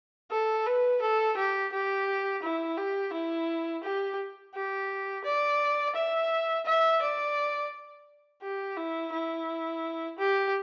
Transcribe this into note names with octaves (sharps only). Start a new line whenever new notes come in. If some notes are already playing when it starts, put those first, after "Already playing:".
A4
B4
A4
G4
G4
E4
G4
E4
G4
G4
D5
E5
E5
D5
G4
E4
E4
G4